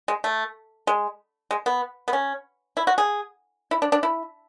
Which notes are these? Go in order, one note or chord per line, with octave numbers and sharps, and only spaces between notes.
G#3
A3
G#3
G#3
B3
B3
C#4
E4
F#4
G#4
E4
D4
D4
E4